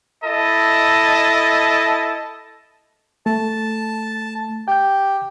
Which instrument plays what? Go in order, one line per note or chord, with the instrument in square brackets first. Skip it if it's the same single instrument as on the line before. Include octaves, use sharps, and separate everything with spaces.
[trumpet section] E4 A4 D#5 A5
[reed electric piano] A3 [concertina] A5
[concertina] G4 [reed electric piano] G5 G6